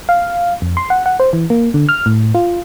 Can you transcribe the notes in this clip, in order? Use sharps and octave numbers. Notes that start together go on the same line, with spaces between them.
F5
F2
C6
F#5
F#5
C5
E3
A#3
D3
F6
A2
F4